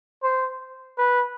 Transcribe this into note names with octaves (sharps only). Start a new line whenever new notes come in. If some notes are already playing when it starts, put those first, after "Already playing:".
C5
B4